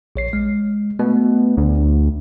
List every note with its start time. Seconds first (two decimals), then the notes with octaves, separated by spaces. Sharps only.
0.16 A#1 C#5 C7
0.33 G#3
0.99 B2 A3
1.57 D2